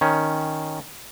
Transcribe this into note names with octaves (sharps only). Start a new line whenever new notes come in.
D#3 C#4